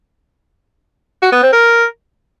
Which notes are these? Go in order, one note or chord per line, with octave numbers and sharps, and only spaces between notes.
F#4
B3
C4
A#4